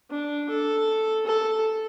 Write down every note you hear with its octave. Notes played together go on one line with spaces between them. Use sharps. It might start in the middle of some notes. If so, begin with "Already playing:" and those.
D4
A4
A4